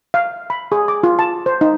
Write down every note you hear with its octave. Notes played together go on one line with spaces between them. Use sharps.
F5
B5
G#4
D6
F4
A5
C5
D#4